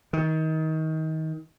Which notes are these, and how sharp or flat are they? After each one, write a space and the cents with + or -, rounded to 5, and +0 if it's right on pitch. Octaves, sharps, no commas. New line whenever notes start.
D#3 +25